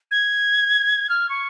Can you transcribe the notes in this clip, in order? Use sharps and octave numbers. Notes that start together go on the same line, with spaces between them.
G#6
F6
C#6